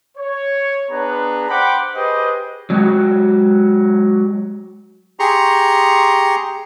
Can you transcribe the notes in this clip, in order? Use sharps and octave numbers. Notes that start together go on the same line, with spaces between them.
C#5
B3 D4 G#4 B4 A#5
C5 F#5 G5 B5 D6
G4 G#4 B4 C5 D#5
F#3 G#3 F#4 G4
G4 G#4 A#5 C6 C#6